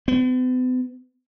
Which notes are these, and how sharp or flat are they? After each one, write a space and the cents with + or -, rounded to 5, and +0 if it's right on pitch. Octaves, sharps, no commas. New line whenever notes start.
B3 +45